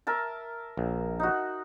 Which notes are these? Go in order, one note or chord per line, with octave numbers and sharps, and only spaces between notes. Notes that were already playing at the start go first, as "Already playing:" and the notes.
A#4 E5 A5
A#1
D#4 F#4